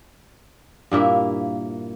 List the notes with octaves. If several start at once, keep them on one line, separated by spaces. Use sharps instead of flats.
G2 A#2 A#3 E4